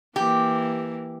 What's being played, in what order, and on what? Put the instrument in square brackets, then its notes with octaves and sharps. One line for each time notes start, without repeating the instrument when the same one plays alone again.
[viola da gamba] E3 A#3 [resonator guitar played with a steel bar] G4